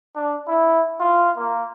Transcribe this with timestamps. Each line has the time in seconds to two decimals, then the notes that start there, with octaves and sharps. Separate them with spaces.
0.16 D4
0.48 E4
1.01 F4
1.38 A#3